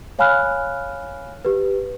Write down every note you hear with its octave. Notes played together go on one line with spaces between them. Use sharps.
C#5 F5 G#5 B5 F6 F#6
G4 B4